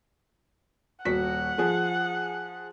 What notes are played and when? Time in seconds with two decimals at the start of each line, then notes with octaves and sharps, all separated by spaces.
1.05 D#1 F#4 F#5 B6
1.58 F3 G#4